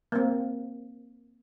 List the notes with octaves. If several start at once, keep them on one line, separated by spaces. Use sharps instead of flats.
A#3 C4